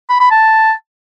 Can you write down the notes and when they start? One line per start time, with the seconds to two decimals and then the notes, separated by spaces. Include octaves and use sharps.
0.10 B5
0.20 B5
0.31 A5